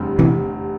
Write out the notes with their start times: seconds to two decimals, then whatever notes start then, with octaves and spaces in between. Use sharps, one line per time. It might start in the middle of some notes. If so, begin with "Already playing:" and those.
Already playing: F1 E2 D3 G3 C4
0.19 C3 E3